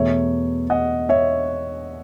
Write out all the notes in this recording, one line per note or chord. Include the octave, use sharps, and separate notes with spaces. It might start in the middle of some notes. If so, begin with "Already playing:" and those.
Already playing: E2 B2 A3 C#5 E5
D#5 F#5
C#5 E5